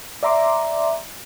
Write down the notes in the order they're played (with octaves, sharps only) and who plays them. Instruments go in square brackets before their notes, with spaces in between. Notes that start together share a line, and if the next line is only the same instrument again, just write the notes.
[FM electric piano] D5 E5 A#5 C6 D6